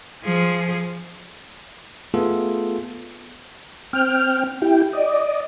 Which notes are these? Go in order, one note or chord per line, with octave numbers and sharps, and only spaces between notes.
F3 G#4
A3 B3 F4 G#4 A4
C4 G5 F6
E4 G4 G5
D5 D#5